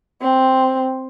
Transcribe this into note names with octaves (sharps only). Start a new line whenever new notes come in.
C4